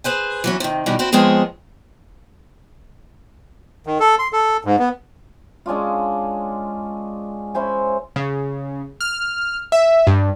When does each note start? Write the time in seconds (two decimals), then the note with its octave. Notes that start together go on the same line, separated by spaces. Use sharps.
0.04 G#4 B4 C5 G#5
0.44 E3 F#3 C#4
0.60 C3 D#3
0.86 B2 D#3 E3 G3
0.99 C4 E4 F#4
1.12 F3 G#3 B3 C4 G#4 C#5
3.87 D#3
4.00 A4
4.19 C6
4.33 A4
4.65 G#2
4.79 B3
5.66 G#3 C#4 D4 F4
7.54 C#4 E4 C5 G#5
8.16 C#3
9.01 F6
9.72 E5
10.07 G2